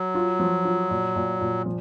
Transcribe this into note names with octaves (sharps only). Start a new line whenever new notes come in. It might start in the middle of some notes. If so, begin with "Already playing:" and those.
Already playing: F#3
F4
F3
F4
A#2
A#2
A#2
F3